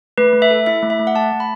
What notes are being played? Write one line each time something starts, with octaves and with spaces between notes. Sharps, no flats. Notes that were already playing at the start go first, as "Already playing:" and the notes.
A3 B4
A3
E5
A4
E4 E5
A3
E5
A3
F#5
A3 A5
A3
B5